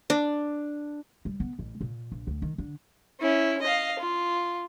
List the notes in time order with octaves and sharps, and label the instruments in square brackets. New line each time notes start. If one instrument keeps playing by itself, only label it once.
[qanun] D4
[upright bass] G3
B3
A1
A#2
A#1
D2
D#3
D3
[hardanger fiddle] C#4 E4
D#5 F5
F4